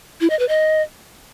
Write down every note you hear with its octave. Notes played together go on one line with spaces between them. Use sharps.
E4
D#5
B4
D#5